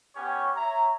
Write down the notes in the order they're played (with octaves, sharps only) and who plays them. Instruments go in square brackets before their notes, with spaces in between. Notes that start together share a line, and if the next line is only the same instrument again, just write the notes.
[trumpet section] B3 C#4 G4 C#5
C#5 E5 A#5